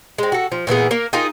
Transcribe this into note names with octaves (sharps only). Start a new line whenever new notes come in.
G#3 C4
F#4 A4
F3
A#2 E3 B3 G#4
A#3 A#4
D#4 F4 G#4 A#4